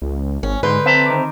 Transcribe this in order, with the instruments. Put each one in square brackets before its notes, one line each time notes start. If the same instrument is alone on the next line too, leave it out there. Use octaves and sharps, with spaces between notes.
[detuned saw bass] C#2
[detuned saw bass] G#1 [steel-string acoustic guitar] C#4
[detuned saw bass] G#2 [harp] D3 C6 G6 [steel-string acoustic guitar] B4
[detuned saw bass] C4 [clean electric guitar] E5 A5 A#5
[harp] D#3 D6